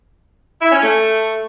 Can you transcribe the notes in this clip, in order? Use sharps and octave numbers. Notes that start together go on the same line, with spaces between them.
E4
C#4
A3